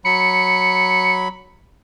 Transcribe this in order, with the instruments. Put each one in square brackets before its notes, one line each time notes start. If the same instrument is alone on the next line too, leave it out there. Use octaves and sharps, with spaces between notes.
[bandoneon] F#3 B5 [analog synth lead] C#7